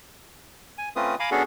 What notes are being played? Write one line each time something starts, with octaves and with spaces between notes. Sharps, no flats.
G#5
A3 C4 C#4 F4 B4 D#6
F5 G#5 A#5 B5 D6
B3 C#4 D4 F#4 G#4 A4